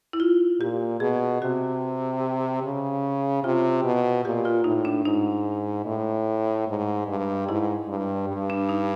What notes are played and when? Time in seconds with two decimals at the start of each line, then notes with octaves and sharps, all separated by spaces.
0.13 E4
0.20 F4
0.60 A#2 G4
1.00 B2 G#4
1.42 C3 F#4
2.63 C#3
3.43 C3 F4
3.83 B2
4.24 A#2 G4
4.45 F4
4.64 A2 D#4
4.85 D4
5.05 G#2 D#4
5.86 A2
6.67 G#2
7.08 G2
7.49 G#2 E4
7.89 G2
8.29 G2
8.50 D4
8.69 D#4